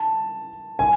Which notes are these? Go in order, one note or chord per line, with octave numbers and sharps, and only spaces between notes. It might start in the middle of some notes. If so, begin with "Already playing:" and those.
Already playing: A5
G#5